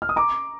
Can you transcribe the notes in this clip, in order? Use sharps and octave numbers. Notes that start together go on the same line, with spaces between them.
F6
D#6
A#5 D6